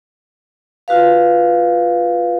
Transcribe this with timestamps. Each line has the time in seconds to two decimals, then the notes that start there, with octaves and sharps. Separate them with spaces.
0.88 F4 F#4 B4 F5